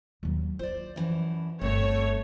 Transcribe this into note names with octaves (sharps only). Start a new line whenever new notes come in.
D#2 F#3
F4 C5 D5
F#2 E3 F3
G1 A3 C4 C#5 A5